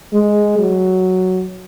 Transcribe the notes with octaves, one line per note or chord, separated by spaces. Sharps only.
G#3
F#3